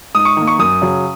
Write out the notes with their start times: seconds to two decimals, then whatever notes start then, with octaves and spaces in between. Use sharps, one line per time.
0.15 G#2 D#6
0.25 C#6
0.37 D#3 A#3
0.47 C#6
0.59 F#2 D#6
0.82 C#3 F#3